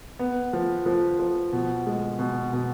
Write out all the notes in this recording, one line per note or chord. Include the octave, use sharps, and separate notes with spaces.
B3
F3
F3
F3
B2
G#3
B2
B2